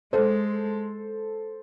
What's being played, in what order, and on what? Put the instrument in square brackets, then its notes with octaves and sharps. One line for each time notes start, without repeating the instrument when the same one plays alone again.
[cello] G#3 [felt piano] A4 C5